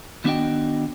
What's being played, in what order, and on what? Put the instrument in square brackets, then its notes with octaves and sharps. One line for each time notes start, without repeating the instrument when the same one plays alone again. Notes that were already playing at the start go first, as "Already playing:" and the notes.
[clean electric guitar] D#3 B3 D4 F#4 D#5 G5